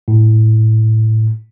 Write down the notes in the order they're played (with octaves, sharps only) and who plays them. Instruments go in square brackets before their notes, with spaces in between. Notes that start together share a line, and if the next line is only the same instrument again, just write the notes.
[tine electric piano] A2